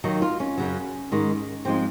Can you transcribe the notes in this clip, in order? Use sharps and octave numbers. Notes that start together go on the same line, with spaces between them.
D#2 D#3 F#3 D#4
F4
C#4
F#2 C#3 F#3
G#2 D#3 G#3
G#2 F3 G#3 C4